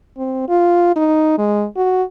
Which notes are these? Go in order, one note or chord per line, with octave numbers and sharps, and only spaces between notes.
C4
F4
D#4
G#3
F#4